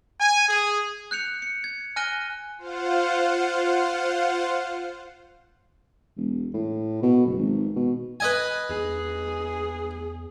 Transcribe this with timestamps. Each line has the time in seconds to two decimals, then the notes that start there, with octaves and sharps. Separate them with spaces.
0.19 G#5
0.49 G#4
1.11 F#6 G6 C#7 F7
1.42 C#7
1.64 G#6
1.96 G#5 F6 F#6 A#6 D#7 G7
2.58 F4 C5 F5 F#5
6.17 E1
6.54 A2
7.03 B2
7.25 F#1
7.37 G#1
7.76 B2
8.20 B4 D#5 G#5
8.69 E2 G#4